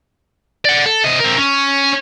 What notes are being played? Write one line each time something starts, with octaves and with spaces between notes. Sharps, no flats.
D5 F#5
A4
C3 D#5
C4 A#4
C#4